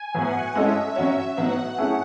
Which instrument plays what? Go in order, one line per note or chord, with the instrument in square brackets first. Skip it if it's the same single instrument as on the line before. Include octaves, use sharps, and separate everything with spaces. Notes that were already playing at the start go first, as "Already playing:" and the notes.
Already playing: [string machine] G#5
[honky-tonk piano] A2 F#3 B3 [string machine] F#5
[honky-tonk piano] G#3 C#4 E4 A4 D#5 [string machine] E5
[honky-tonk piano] F#3 C#4 F#4 C#5
[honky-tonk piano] A2 F#3 B3 D#4 F#4 [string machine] F#5
[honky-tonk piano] A3 C#4 E4 G#4